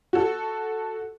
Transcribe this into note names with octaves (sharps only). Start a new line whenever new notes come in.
F#4 A4